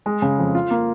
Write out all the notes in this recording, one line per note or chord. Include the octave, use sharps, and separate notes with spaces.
G#3
C#3
F2
F4
A#3